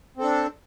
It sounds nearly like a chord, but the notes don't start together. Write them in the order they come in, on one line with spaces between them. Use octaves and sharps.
C4 A4 D4